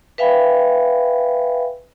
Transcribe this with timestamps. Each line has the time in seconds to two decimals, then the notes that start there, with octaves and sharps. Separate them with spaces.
0.18 B4 E5 F5 G5 G#5 B5